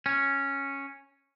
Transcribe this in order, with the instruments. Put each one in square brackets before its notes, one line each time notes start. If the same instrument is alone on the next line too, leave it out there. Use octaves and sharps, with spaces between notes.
[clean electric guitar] C#4